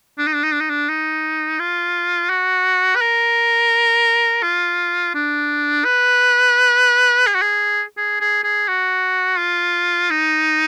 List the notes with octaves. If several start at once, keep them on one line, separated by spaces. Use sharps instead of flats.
D4
D#4
D4
D#4
D4
D#4
D4
D#4
F4
F#4
B4
A#4
F4
D4
B4
G#4
F#4
G#4
G#4
G#4
G#4
F#4
F4
D#4